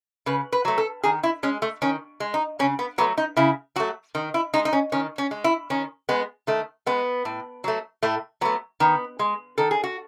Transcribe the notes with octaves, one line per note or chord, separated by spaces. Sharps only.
C#3 B4
B4
F#3 A3
A4
D#3 G#4
E4
G#3 C#4
A3
D#3 C#4
G#3
D#4
C#3 C#4
B3
F#3 A3 B3
D#4
C#3 E4
F#3 A3 F#4
D#3
E4
G#3 D#4
D#4
C#4
D#3 C#4
C#4
G#3
E4
D#3 C#4
G#3 B3
D#3 A3
G#3 B3
A2
F#3 A3
A2 A3
F#3 A3 B3
D#3 B3
G#3
D#3 A4
G#4
F#4